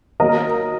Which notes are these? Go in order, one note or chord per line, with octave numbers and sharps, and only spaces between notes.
D#3 F#3 A#3 A#4 D#5